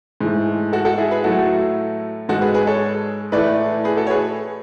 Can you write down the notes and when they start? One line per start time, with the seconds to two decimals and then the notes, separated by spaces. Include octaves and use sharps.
0.21 G#2 E3 A3
0.73 F#4 A4
0.85 F#4 A4
0.98 E4 G#4
1.11 G#4 B4
1.24 A2 F#3 A3 F#4 A4
2.29 G#2 G#3 F#4 A4
2.41 G#4 B4
2.54 G#4 B4
2.67 A4 C#5
3.32 A2 E3 A3 B4 D5
3.84 G#4 B4
3.97 F#4 A4
4.07 C#5
4.10 G#4 B4